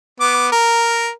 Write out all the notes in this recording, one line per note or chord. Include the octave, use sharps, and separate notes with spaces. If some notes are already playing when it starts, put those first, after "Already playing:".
B3 D6
A#4